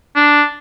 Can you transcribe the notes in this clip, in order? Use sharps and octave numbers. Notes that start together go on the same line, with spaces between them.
D4